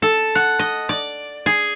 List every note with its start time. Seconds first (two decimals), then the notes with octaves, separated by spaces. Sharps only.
0.02 A4
0.35 F#5
0.59 D#5
0.89 D5
1.46 G#4